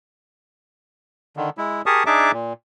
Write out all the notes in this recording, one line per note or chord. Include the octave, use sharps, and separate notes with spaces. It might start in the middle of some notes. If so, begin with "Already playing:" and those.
D3 D#3
G#3 E4
G4 G#4 A#4 A5 C#6 D#6
D4 D#4 G#4 E5 A5 D6
A#2